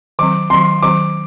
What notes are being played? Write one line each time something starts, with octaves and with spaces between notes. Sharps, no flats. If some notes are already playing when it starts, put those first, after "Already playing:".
D#3 F#3 C4 D6
D#3 F#3 C4 C6
D#3 F#3 C4 D6